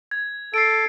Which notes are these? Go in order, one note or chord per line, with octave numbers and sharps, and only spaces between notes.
G#6
A4 C7 D7